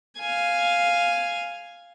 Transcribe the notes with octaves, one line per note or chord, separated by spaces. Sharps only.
F5 G#5